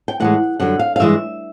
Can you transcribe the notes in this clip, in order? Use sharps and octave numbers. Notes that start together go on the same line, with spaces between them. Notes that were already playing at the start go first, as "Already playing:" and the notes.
G5
A2 E3 G#3 F#5
F#2 D3 G3 F#5
F5
F5
G2 E3 G#3 E5